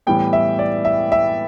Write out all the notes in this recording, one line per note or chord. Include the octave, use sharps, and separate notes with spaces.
A2 E3 G3 B3 G5
E5
D5
E5
E5